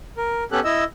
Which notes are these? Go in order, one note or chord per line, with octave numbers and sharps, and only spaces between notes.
A#4
B3 C#4 G4 A4 F#6
E4 D#5 E6